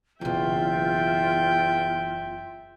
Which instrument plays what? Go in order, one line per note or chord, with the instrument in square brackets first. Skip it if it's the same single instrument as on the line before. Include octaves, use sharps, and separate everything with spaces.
[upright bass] F#1 B2 [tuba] E2 [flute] F4 [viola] E5 G5